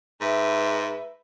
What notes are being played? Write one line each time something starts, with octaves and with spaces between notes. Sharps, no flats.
G#2 B4 E5